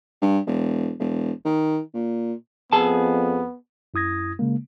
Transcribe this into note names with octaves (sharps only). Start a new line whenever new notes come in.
G2
E1
E1
D#3
A#2
F2 B3 G#4 A5
F#2 E4 D#6 G#6 A#6
C#3 G#3 A#3